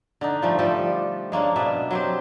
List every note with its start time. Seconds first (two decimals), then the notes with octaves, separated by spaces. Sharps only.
0.21 D3 D4 D#4
0.42 F3 G3 A3
0.59 F3 G3 G4 A4
1.32 G#3 A#3 C#4 D4
1.56 B2 B3 D4 E5
1.91 F#3 C4 G4